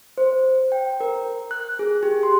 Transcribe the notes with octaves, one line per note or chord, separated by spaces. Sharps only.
C5
G5
A#4
F#6
G#4
G4
C6